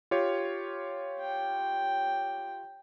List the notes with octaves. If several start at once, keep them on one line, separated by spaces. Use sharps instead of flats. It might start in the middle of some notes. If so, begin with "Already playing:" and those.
F4 G4 C#5
G5